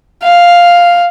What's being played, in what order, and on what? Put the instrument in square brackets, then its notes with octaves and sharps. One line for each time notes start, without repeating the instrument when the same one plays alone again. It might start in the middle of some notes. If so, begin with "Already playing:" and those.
[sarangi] F5